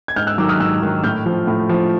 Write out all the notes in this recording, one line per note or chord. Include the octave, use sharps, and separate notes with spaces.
G#6
G#2 F6 G6
E6 F#6
D#3 F#3 D6 E6
D#6 F6
G#2 E6 F#6
D#3 F#3
A2 F6 G6
F3
A2
F3